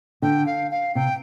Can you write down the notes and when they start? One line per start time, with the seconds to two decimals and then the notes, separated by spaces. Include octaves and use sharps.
0.22 D3 G5
0.46 F5
0.71 F5
0.95 C3 G5